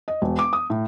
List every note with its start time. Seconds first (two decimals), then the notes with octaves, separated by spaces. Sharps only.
0.08 D#5
0.22 E1
0.39 D6
0.53 D#6
0.70 A2